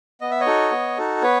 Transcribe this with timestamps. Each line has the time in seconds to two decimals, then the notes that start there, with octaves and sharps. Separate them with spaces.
0.21 B3 D#5
0.31 E5
0.40 C#5 D#5
0.46 D#4 F#4 A4
0.72 B3
0.98 D#4 F#4 A4
1.22 B3 B4 C#5